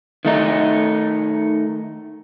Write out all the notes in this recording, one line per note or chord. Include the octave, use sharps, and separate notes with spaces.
D#3 A3 D#4